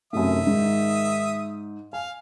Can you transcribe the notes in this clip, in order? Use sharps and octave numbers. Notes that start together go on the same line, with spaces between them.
F#2 C3 D#3 A3 E5 D#6
G#2
F5 G#5